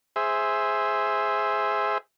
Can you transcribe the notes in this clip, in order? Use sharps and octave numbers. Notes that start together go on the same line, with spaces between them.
G#4 C5 E5